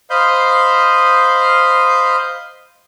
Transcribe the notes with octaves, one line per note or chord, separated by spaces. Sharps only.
C5 D#5 F5 B5 G6